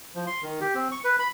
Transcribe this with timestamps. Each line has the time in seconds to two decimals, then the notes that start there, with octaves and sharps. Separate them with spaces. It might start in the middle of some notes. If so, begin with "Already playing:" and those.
0.15 F3
0.27 C6
0.43 D#3
0.61 G4
0.75 C4
0.92 C#6
1.04 B4
1.19 B5